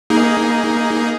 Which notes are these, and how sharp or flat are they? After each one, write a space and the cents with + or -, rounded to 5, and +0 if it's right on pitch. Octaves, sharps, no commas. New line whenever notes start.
A#3 +0 D#4 +10 G#4 +0